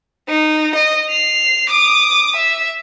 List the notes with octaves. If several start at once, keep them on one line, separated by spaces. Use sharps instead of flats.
D#4
D#5
C7 F7
D6 D#6
E5